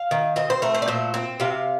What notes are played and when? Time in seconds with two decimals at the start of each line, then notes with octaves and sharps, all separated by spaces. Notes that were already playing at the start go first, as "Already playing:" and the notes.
Already playing: F5
0.11 D#3
0.36 C4 D#5
0.50 C5
0.62 A3 A#4
0.75 C5
0.82 D5
0.88 A#2 C5
1.14 C4
1.40 C3 F5